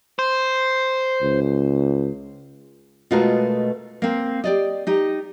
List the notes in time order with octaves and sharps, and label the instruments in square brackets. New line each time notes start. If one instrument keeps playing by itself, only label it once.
[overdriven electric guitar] C5
[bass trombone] C#2
[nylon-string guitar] B2 G#3 A3 F4 F#4 A#4
A#3 C4
G4 D5 D#5
D#4 G4